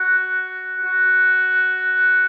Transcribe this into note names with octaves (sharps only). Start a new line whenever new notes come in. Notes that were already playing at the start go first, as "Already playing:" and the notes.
Already playing: F#4
F#4